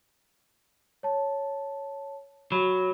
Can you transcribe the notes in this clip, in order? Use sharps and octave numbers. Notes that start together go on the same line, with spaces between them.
C#5 A5
F#3 B5